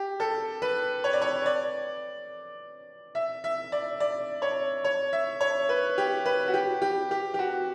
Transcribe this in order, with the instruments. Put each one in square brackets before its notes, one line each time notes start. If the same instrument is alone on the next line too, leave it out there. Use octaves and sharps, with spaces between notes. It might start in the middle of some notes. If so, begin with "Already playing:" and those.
Already playing: [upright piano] G4
A4
B4
C#5
D5
C#5
D5
E5
E5
D5
D5
C#5
C#5
E5
C#5
B4
G4
B4
F#4
G4
G4
G4
G4
F#4